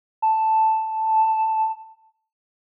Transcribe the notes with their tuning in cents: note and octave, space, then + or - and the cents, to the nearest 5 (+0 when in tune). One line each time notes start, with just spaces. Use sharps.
A5 +0